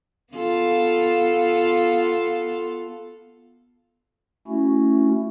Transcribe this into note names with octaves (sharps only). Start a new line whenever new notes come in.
B3 F4 A4
A3 C#4 E4 F#4